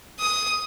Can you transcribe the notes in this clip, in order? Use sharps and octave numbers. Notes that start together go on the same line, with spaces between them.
D#6